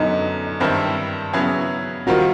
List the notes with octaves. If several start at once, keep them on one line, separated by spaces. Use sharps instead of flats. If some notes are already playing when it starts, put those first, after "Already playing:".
Already playing: F#2 D3 F#3 B3 D#4
G2 D#3 G3 C4 E4
C#3 F#3 B3 E4 G#4
D#3 G3 C4 F4 F#4 A#4